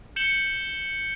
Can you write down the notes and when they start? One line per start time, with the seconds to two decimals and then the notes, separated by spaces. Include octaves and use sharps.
0.16 G6 C#7 E7 F#7 G7